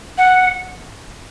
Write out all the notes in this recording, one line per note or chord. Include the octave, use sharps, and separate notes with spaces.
F#5